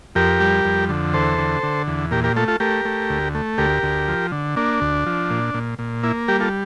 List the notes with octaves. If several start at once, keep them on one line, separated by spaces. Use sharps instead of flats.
F2 G4 A#4
G3
F2
D3
E2 A4 C5
D3
D3
E2
A#2 G4 A#4
G4 A#4
A3 F4 A4
F4 A4
A3 G4 A#4
A3
D2
A3
D2 G4 A#4
D2
F3
D3
A#3 D4
D2
F3
A#2
A#2
A#2
A#3 E4
G3 G4 A#4
F4 A4